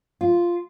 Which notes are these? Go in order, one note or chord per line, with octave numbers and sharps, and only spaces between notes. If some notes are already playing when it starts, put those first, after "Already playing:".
F4